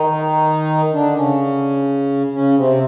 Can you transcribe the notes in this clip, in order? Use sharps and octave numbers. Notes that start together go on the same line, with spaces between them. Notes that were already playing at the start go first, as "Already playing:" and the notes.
Already playing: D#3 D#4
D3 D4
C#3 C#4
C#3 C#4
C3 C4